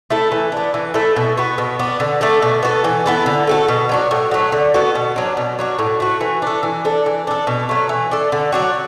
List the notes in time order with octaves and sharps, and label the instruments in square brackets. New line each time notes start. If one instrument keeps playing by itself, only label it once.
[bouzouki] A3 E4 A4
E3
B3 D4
E3
A3 E4 A4
B2
B3 F#4
B2
B3 D4
D3
A3 D4 A4
B2
B3 F#4 A4
E3
B3 E4 A4
D3
A3 F#4 A4
B2
F#3 D4 F#4
A2
F#3 A3
D3
B3 F#4 A4
B2
F#3 D4
B2
F#3 D4 F#4
A2
A3 F#4
E3
D4 A4
E3
D4 A4
E3
D4 A4
B2
F#3 A3
E3
D4 A4
D3
F#3 D4 F#4